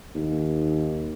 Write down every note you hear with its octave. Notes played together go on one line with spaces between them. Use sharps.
D#2